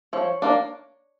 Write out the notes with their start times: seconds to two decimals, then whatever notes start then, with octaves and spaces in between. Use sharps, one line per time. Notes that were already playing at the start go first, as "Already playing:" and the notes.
0.13 F3 C#5
0.42 A#3 D4